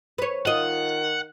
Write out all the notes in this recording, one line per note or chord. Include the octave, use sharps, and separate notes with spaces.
B4 C#5
D#3 F4 D#5 F#5